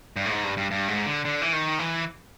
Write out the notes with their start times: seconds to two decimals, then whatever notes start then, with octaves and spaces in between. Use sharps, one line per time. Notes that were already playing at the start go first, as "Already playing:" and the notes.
0.16 G2
0.26 A2
0.30 G#2
0.44 G2
0.57 G2
0.71 G2
0.88 G#2
1.06 D3
1.25 D3
1.42 E3
1.53 D#3
1.79 E3